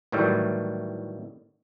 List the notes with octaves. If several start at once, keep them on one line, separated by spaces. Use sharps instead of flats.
A2 D#3 E3 F#3 G3